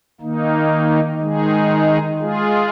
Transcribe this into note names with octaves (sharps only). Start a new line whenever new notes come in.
D#3 A#3 D#4
D#3 G#3 D#4 G#4
G#3 F4 G#4